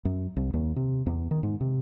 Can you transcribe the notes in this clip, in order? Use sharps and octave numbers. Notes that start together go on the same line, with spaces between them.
F#2
C2
D#2
C3
E2
D#3
G#2
C3